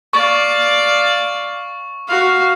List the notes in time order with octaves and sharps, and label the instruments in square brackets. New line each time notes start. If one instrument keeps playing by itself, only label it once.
[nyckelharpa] D5 F5 [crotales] C#6
[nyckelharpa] F#4 F5